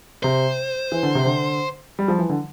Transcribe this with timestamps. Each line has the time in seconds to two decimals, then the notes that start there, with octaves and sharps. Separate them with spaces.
0.23 C3 C5
0.92 E3
1.03 D3
1.15 C3
1.25 D3
1.99 G3
2.08 F3
2.18 E3
2.29 D3